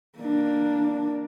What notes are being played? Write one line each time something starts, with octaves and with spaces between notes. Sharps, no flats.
A#3 D4